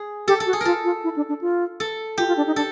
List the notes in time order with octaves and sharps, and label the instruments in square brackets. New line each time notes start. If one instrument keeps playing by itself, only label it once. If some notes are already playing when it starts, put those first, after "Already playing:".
Already playing: [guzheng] G#4
[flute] G4 [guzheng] A4
[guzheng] A4
[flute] F#4
[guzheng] G#4
[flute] F4 [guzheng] A4 A#4
[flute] F4
E4
D4
D4
F4
[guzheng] A4
[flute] F4 [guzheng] G4
[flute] F4
D4
D#4
[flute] D4 [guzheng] A4